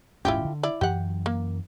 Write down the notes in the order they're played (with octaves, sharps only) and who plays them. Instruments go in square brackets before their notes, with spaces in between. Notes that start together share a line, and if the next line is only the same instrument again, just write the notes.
[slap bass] D#1 G#2 C#4 [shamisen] E4 F4 G4
[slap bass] D3
[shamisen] E4 D5
[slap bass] F#2 E3 F#3 [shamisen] G4 F#5
[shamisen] A#3